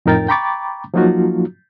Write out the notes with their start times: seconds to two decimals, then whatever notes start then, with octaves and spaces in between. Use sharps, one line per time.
0.06 F2 A2 D#4 A#4 G5 A6
0.28 G5 A#5 B5 C#6 D6 A6
0.94 F3 F#3 A#3 D#4 F4 F#4